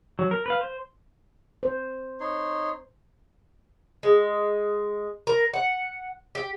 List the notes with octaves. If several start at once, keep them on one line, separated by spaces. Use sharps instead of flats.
F#3
A#4
B4 F5
C5
C5
D#4 C#5 C6
G#3
A#4
F#5
G4